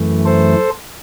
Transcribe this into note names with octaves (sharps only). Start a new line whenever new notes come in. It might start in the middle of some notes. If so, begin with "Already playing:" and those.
Already playing: F#2 E3 A3
A4 C5